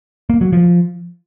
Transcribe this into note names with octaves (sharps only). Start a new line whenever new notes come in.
A#3
F#3
F3